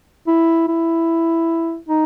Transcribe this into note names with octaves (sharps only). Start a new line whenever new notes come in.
E4
E4
D#4